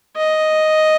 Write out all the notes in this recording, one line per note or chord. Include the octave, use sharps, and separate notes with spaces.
D#5